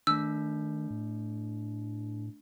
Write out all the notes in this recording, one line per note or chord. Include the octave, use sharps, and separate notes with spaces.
D#3 A3 D4 E6
A2